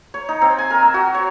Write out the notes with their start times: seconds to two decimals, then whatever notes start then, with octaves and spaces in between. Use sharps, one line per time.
0.14 C#5
0.29 D#4
0.41 C4
0.58 G#5
0.70 A#4
0.83 E6
0.94 F#4
1.14 C#5